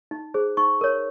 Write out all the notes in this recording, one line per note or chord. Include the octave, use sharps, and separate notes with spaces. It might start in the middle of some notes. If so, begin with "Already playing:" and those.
D#4
G#4 C5
D#4 C#6
A#4 C#5